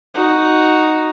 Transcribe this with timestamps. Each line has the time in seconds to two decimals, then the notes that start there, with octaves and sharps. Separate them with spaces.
0.15 D#4 F#4